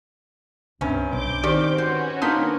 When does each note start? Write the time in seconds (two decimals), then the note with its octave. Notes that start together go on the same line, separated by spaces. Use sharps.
0.81 G1 C#2 G2 C3 C#4
1.13 B1 C5 D6 G6
1.43 D#3 C4 G4 D5
1.78 C#4 F#4 B4 C5
2.22 A#3 D4 D#4 F4 D#6 G6 B6